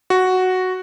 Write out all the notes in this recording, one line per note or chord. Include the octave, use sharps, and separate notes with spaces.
F#4